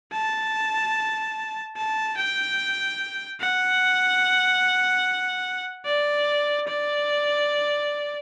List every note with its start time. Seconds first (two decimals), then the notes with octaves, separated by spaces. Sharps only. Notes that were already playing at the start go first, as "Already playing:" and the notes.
0.12 A5
1.76 A5
2.17 G5
3.40 F#5
5.86 D5
6.68 D5